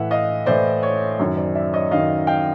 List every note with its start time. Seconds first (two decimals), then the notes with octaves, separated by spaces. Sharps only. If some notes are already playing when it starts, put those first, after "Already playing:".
Already playing: A2 E3 E5 F#5
0.11 D#5 F5
0.46 A2 E3 C5 D5
0.83 C#5
1.19 F#2 D#3 C#5
1.37 C5 D5
1.55 D5 E5
1.73 C#5 D#5
1.91 F#2 D#3 D#5 F5
2.27 F5 G5